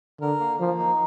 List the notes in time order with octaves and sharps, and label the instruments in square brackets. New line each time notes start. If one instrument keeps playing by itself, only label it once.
[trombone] D3 [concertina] A#4
[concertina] A#3
[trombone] F3 [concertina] A#3
[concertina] D#4